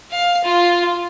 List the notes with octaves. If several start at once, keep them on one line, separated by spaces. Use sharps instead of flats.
F5
F4